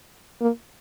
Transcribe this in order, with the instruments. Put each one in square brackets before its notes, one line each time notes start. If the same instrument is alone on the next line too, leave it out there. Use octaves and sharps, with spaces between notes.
[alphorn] A#3